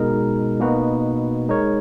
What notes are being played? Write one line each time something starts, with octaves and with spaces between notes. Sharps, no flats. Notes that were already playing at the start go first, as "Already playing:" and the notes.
Already playing: B2 G#3 D#4 A#4
B2 A#3 D#4 F#4 B4
G#3 D#4 A#4 C#5